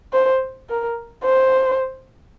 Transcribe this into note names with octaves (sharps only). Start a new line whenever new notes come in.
C5
A#4
C5